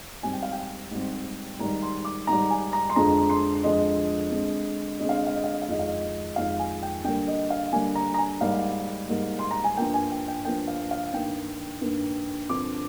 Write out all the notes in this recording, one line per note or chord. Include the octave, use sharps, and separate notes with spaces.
G#2 G3 C4 G#5
G5
F5
G5
G#2 G3 C4
G#2 D#3 G3 A#5
C6
D6
G#2 D#3 G3 A#5
G#5
A#5
C6
F2 D3 F3 G#3 A#5
C6
F2 D3 F3 G#3 D#5
D3 G#3 C4
D3 G#3 C4 D#5
F5
D#5
F5
D#5
F5
D#5
F5
F2 D#3 G#3 D#5
F5
D#5
F2 D#3 G#3 F5
G#5
G5
D3 G3 A#3 G5
D#5
F5
D3 G3 A#3 G#5
A#5
A#5
G#5
G#2 G3 A#3 F5
G#2 G3 A#3
C6
A#5
G#5
G2 F3 A#3 G5
G#5
G5
G5
G2 F3 A#3 G5
F5
F5
G2 D#3 A#3 G5
G2 D#3 A#3
G2 D3 F3 C4 D6